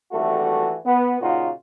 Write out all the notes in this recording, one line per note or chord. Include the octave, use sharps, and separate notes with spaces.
G#1 E3 G3 A3 F#4 A4
B3
A#2 C#3 D#4 F4 F#4